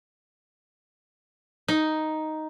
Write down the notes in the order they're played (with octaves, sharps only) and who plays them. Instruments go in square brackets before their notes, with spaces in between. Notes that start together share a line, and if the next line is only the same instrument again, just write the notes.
[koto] D#4